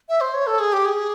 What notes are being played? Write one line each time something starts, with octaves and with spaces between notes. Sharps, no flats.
E5
C5
C#5
A4
G#4
G4
G#4